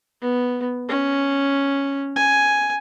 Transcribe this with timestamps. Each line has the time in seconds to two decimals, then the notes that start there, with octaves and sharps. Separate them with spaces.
0.21 B3
0.89 C#4
2.16 G#5